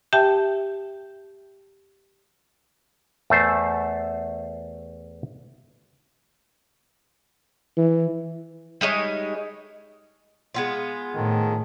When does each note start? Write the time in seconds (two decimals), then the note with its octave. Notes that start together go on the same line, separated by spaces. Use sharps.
0.13 G4 E5 G5 A5
3.30 E2 A3 C5
7.77 E3
8.81 G3 G#3 D#4 C#5
10.55 G#3 B3 F4
11.15 A2 D#3 F3 A4